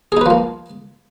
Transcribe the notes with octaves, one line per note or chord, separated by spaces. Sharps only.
F3 A#3 D#4 G#4 B4